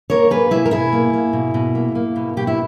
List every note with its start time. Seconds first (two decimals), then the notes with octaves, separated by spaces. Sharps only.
0.10 A#3 A#4 C#5
0.30 A#3 G#4 B4
0.51 B2 E4 G#4
0.66 A#4
0.71 B2 E4 G#4
0.93 A#3
1.13 A#3
1.33 B2
1.54 B2
1.75 A#3
1.95 A#3
2.16 B2
2.37 B2 G4
2.47 E4